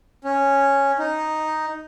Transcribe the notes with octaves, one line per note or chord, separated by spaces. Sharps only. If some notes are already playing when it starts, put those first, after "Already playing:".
C#4
D#4